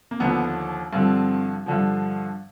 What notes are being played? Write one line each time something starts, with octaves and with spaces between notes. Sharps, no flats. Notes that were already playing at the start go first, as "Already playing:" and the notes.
A#3
D#2 D3 F3 B3
G2 D3 F3 C4
G2 D3 F3